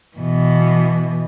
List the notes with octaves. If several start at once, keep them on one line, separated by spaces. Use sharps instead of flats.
B2 E3